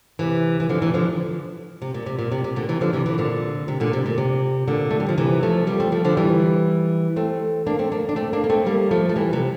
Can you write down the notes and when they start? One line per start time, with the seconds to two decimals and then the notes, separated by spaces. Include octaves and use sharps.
0.19 C3 E3
0.60 E3
0.69 D3 F3
0.82 C3 E3
0.94 D3 F3
1.82 C3
1.94 A#2
2.06 C3
2.19 A#2
2.32 C3
2.44 C3
2.56 A#2 D3
2.69 C3 E3
2.81 D3 F3
2.93 C3 E3
3.06 C3 E3
3.18 A#2 D3
3.68 C3
3.80 A#2 D3
3.93 C3
4.06 A#2
4.18 C3
4.68 A#2 D3
4.91 A3
5.00 G3
5.09 F3
5.18 C3 E3
5.43 F3 A3
5.67 G3 A#3
5.80 A3 C4
5.92 F3 A3
6.05 D3 F3
6.17 E3 G3
7.16 A3 C4
7.67 A#3 D4
7.79 A3 C4
7.92 A#3 D4
8.09 D4
8.16 A3 C4
8.33 A#3 D4
8.44 A#3
8.50 A3 C4
8.66 G3 A#3
8.91 F3 A3
9.09 A3
9.15 E3 G3
9.33 C3